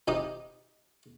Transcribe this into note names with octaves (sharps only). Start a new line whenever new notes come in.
C3 D#4 G4 D#6